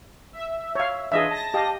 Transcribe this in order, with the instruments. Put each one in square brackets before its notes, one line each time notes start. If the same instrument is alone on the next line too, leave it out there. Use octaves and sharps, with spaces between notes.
[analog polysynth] E5
[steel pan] C#5 F5
[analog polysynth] E3 D4 F4 [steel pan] G#4 D#5 E5
[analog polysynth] A5 A#6
[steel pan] G4 D#5 F5